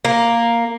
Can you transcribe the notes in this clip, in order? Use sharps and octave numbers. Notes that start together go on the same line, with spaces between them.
A#3